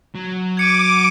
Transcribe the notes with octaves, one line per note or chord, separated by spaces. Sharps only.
F#3
D6 G#6 C#7 D#7